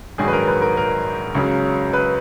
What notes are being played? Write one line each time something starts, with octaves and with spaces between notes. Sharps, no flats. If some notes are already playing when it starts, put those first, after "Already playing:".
A#1 G#2 D#3 F#3 G#4
B4
A#4
B4
A#4
A#4
C#2 C#3 F#3
B4